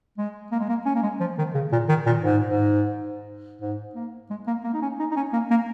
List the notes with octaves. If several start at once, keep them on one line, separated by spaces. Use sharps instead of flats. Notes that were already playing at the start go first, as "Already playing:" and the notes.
G#3
A#3
G#3
A#3
C#4
A#3
G#3
F3
D#3
C#3
A#2
D#3
A#2
G#2
G#2
G#2
A#3
G#3
A#3
A#3
D#4
C#4
D#4
D#4
C#4
A#3
A#3